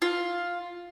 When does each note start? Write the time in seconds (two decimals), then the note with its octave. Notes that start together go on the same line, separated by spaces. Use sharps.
0.02 F4